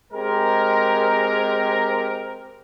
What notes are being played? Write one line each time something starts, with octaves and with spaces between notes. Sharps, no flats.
G#3 C4 G4 G#4 A#4